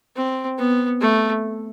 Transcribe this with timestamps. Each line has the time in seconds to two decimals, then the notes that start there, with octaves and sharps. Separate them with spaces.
0.16 C4
0.58 B3
1.01 A3